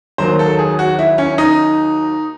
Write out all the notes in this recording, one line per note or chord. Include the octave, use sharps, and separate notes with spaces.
D#2 D#3 F#3 C5
A4
G#4
F#4
E4
C#4
D#4